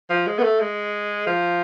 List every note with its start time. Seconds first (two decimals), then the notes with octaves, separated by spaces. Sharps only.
0.10 F3
0.26 G#3
0.39 B3
0.43 A3
0.60 G#3
1.27 F3